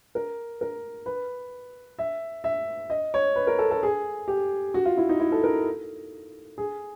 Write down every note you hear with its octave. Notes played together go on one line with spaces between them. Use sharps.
A#4
A#4
B4
E5
E5
D#5
C#5
B4
A#4
A4
A4
G#4
G4
F#4
F4
E4
D#4
E4
A4
A#4
G#4